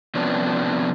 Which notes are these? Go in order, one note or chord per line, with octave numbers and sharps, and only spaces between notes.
C3 F3 B3 C#4 D4